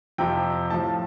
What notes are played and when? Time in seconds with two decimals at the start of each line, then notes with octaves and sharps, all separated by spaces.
0.18 F2 C3 F3 G5
0.70 A2 F3 A5